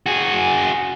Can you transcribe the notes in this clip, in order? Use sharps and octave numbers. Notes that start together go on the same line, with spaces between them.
F#4 G#4